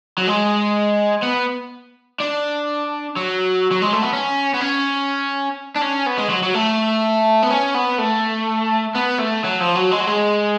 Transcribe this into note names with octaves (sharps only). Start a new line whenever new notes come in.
F#3
G#3
B3
D4
F#3
F#3
G#3
A3
B3
C#4
B3
C#4
D4
C#4
B3
G#3
F#3
F#3
A3
B3
C#4
B3
A3
B3
A3
F#3
F3
F#3
G#3
F#3
G#3